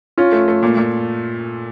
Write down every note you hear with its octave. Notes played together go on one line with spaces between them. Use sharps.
C#4 F4
A3
A3
A#2
A#2